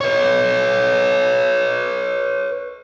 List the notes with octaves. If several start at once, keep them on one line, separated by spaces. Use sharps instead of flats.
B4 C#5